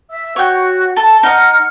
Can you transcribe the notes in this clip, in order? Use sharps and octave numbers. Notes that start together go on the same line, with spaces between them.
E5 E6
F#4 C#5 G5
A4 A5
D#4 D#5 F#5 F6